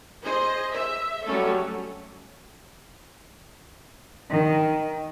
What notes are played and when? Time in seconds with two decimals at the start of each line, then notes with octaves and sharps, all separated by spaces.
0.23 G#4 C5 D#5
0.72 E5
1.25 F#3 G3 A3 C#4 A4
4.29 D#3